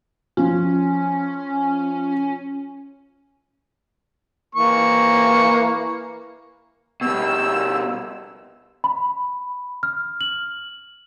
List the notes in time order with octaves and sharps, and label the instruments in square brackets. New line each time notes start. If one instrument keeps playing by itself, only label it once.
[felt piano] F3 F4 [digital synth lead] C#4
[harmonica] E3 A#3 C#6
[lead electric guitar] B2 G3 [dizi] E6
[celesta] B5
F6
F#7